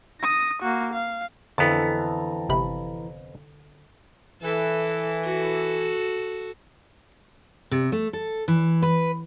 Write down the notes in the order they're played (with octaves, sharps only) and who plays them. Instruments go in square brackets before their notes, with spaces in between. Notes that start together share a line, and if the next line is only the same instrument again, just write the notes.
[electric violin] D#6 A#6
A#3 F#4
F5
[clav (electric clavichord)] F2 B3 [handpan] D3 A4 [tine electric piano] E3 A#5 A6
[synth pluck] G1 C3 B5
[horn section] E3 [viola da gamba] A4
[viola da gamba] F#4 A4
[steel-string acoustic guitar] C3
A3
A4
E3
B4